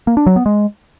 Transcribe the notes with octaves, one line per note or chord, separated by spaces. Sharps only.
A#3
D4
F#3
B3
G#3